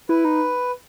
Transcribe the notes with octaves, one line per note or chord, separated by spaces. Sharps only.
E4 B4
D#4